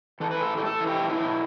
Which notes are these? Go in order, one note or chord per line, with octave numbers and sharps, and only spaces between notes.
E3 A4
A2 B4
A4
A3
G4
A2 A4
E3
G4
A2
F#3 E4
B2